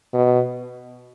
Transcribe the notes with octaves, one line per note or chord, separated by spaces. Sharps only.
B2